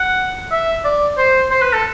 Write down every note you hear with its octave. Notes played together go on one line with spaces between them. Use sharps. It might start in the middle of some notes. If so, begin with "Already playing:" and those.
Already playing: F#5
E5
D5
C5
C5
B4
A4